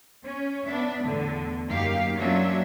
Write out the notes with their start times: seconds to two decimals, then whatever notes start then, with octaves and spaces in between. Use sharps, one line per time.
0.23 C#4
0.67 B3 D4 E5
1.05 E2 A2 D3
1.66 F#2 A#3 D#4 G4 F5
2.17 F#3 A#3 C#4 D4 F4 E5